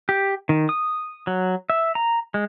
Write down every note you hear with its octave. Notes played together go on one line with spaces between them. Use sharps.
G4
D#3
D#6
F#3
E5
A#5
G#3